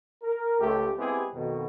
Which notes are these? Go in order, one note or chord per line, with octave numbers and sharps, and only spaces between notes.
A#4
C#2 A3 G4
G#3 B3 C4 E4 G4 G#4
F2 B2 D#3